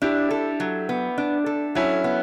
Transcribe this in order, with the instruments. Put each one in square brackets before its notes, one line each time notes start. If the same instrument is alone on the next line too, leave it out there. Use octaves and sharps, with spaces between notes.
[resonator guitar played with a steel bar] D4 [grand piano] E4 G4
[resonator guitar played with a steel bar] A4
F#3
B3
D4
A4
[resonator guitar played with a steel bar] F#3 [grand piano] C#4 E4
[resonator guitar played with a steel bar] B3